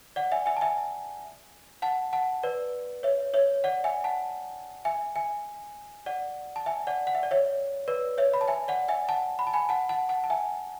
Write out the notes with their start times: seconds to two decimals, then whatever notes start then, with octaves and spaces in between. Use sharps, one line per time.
0.16 D5 F#5
0.32 E5 G#5
0.46 E5 G#5
0.57 A5
0.61 E5 G#5
1.82 F#5 A5
2.13 F#5 A5
2.43 B4 D5
3.03 C#5 E5
3.34 C#5 E5
3.64 D5 F#5
3.84 E5 G#5
4.04 F#5 A5
4.85 E5 G#5
5.16 E5 G#5
6.06 D5 F#5
6.56 A5
6.66 E5 G#5
6.87 D5 F#5
7.07 F#5
7.15 E5
7.23 D5
7.31 C#5 E5
7.88 B4 D5
8.18 C#5 E5
8.34 B5
8.41 A5
8.48 E5 G#5
8.68 D5 F#5
8.88 E5 G#5
9.09 F#5 A5
9.39 B5
9.47 A5
9.54 G#5 B5
9.69 F#5 A5
9.89 F#5 A5
10.09 F#5 A5
10.24 A5
10.30 E5 G#5